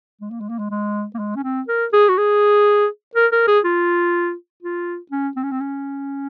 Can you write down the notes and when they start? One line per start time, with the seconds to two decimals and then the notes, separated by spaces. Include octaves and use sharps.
0.21 G#3
0.30 A#3
0.40 G#3
0.49 A#3
0.59 G#3
0.70 G#3
1.14 A#3
1.19 G#3
1.36 C#4
1.44 C4
1.68 A#4
1.93 G#4
2.09 F#4
2.17 G#4
3.15 A#4
3.32 A#4
3.48 G#4
3.65 F4
4.62 F4
5.11 C#4
5.36 C4
5.43 C#4
5.51 C4
5.60 C#4